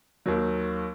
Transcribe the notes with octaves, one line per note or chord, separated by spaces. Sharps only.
D#2 D#3 F#3